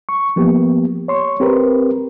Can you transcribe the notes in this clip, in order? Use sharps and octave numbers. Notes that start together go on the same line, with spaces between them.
C#6
F3 A#3 B3 G4
C#5 C6 C#6
C4 G4 A#4 B4